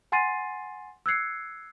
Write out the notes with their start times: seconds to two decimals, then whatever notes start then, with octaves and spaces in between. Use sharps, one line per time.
0.12 F#5 G#5 C6 A6 C7 D#7
1.06 E6 F#6 G#6 C7 C#7